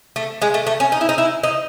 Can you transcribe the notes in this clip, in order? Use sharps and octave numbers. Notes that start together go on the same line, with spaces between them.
A3
G#3
A3
A3
C#4
D#4
E4
D#4
E4
D#4